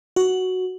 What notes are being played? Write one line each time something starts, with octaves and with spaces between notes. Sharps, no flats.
F#4